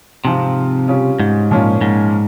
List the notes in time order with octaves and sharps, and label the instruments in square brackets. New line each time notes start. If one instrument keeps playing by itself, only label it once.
[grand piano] G#2 F3 C4 F4 [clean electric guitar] C3
[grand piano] C#3 G3 C#4 F4
[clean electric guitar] G#2
[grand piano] A#2 F3 A#3 C#4 F4
[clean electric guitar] G#2